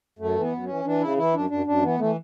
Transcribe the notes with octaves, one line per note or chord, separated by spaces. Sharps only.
F#2 A3
E3
B3
F#2
C#4
E3
E3 D4
C#3 E4
E3 E4
F#2 D4
F#2 D4
F#2 D4
E3 B3
E3 A3